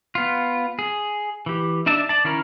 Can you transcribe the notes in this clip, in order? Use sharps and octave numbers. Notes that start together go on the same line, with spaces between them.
B3 F4
G#4
E3 G4
D4 D#4 D5 E5 A5
D5 A5
D#3 C#4 E4 A#4